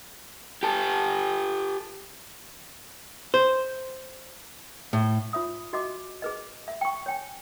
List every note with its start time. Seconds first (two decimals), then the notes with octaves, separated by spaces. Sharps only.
0.63 G4 A4
3.34 C5
4.93 A2
5.33 F4 C#5 E5 D#6
5.73 F#4 D#5 E5 D6
6.22 G#4 B4 D#5
6.68 E5
6.81 G5 C#6
7.06 C#5 G5 G#5